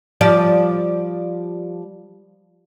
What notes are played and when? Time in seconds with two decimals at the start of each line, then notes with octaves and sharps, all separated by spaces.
0.21 F3 G3 D5